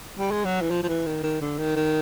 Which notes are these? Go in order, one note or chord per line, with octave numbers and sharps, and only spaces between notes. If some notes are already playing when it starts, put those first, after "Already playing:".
G3
G#3
F#3
E3
F3
F3
E3
D#3
D#3
D3
D#3
D#3